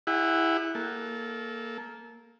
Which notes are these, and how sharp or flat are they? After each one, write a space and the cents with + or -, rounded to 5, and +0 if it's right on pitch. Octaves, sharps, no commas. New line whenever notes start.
E4 +0 G#4 -45 F#5 +0
A#3 +0 A4 -20